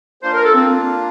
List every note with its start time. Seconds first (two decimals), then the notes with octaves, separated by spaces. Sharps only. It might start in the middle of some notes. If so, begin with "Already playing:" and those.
0.23 A#3 D4 F4 C5
0.34 A#4
0.45 A4
0.55 C4